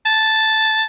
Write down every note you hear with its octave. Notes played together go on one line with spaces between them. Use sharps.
A5